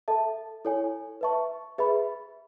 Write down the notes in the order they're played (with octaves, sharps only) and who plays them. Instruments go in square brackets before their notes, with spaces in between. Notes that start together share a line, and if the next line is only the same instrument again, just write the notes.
[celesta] A4 E5 A5
E4 A4 C#5 G#5
B4 E5 A5 C#6
G#4 B4 E5 B5